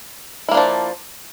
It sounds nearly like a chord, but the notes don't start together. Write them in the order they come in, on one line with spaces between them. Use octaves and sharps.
E4 A#3 D4 F3